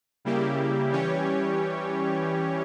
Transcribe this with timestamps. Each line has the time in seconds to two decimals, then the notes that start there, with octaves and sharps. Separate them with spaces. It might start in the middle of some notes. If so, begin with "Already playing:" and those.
0.25 C#3 G3 A#3 E4 G4
0.92 E3 G3 C#4 G4 C#5